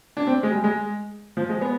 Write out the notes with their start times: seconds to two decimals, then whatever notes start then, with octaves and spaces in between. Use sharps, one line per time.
0.17 D4
0.27 C4
0.43 G#3
0.51 G3
0.64 G#3
1.37 F3
1.49 G#3
1.61 B3